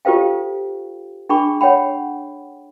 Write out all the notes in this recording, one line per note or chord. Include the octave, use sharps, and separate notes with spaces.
F4 G4 A4 C5 F5 G5
D4 G#4 G5 B5 C#6
C#5 F#5 G5 B5